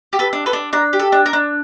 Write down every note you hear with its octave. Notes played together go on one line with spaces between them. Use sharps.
G4
A4 B4
D4
A4 B4
D4
D4 A#4
G4
A4
D4
A#4
D4